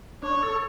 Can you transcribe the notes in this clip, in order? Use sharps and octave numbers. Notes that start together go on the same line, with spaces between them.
D4 C#5
A4